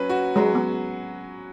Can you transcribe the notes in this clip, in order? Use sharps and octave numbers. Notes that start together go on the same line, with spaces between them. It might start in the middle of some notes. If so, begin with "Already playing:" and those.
Already playing: F#3 C#4 B4
F#4
F#3 G#3
B3